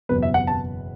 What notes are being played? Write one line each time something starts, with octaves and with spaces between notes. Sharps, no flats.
F#1 E2 B2 B3 B4
E5
F#5
A5